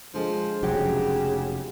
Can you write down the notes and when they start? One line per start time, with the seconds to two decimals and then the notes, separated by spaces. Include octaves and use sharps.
0.14 D3 F3 G#3
0.63 F1 C#3 F#3 G4